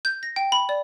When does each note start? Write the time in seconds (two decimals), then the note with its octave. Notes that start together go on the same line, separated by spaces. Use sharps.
0.05 G6
0.23 A#6
0.36 G5
0.52 B5
0.69 D5